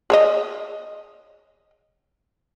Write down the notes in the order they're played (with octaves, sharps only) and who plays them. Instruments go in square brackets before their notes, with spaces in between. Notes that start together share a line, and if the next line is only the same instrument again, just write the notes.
[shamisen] G#4 C#5 D#5